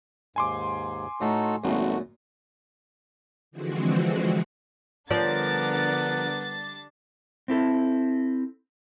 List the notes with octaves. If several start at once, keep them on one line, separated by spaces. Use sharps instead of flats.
D#2 G#2 G#5 C6 D6
A2 D#4 F#4 A4 A#5
G#1 F#2 A#2 A3 F#4
D3 E3 F3 G#3 C4 F#4
D3 F3 G3 B3 D4 A#4 D5 A6
C4 E4 A4